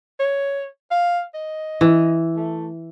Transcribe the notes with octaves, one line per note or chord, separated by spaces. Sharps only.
C#5
F5
D#5
E3
A3